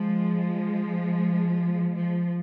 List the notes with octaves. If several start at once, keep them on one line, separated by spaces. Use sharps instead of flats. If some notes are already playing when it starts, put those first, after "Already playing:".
Already playing: F3 G#3
F3